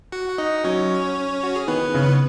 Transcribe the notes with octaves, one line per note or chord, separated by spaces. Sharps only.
F#4 F#5
F#5
D#4 D#5
D#5
F#3 C#4 C#5
F#4
G#4
D#3 B3 B4
C#3